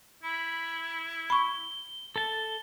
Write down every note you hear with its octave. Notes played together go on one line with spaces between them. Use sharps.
E4 B5
B5 C#6 G7
A4 A5 G7